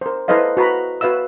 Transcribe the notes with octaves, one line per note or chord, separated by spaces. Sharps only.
A#4 C5
E4 A4 B4 C5 D#5 F5
F#4 B4 A#5 B5
F#4 B4 E5 F5 E6